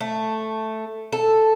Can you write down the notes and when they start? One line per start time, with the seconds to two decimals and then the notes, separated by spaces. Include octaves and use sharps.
0.01 A3
1.12 A4